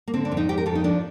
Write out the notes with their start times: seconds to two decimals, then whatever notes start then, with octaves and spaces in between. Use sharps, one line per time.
0.08 A#3
0.14 D3 C4
0.25 D4
0.32 F2
0.37 D#4
0.49 F2 G4
0.58 A#4
0.66 F2 A4
0.75 D#4
0.84 F3 D4